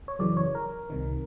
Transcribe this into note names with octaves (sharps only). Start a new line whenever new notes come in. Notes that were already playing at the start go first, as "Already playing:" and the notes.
C#5
F#2 C#3 E3 D5
C#5
A#4
C2 C3 D#3